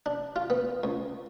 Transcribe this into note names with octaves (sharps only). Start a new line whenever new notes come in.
D4
F4
B3
C#2